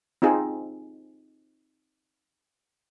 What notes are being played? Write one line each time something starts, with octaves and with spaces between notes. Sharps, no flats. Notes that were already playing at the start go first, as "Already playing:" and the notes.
C4 D#4 F4 G#4